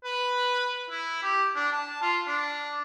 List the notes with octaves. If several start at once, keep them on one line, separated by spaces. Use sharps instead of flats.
B4
E4
G4
D4
A5
F4
D4